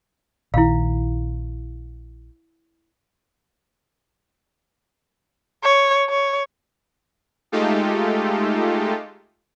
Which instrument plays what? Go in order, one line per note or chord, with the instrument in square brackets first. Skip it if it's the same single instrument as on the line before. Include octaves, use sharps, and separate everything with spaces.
[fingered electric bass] A#1 D#3 [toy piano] E4 F5
[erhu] C#5
C#5
[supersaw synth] G#3 A3 D#4 F4 G4 A4